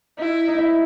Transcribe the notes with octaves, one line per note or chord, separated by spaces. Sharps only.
D#4 E4
D#4
E4